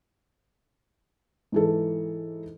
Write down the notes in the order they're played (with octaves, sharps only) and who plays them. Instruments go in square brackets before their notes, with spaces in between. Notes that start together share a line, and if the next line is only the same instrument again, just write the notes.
[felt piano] G#2 E3 A4